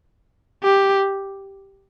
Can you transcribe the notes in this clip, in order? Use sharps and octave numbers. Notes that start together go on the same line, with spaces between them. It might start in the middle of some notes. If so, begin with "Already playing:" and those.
G4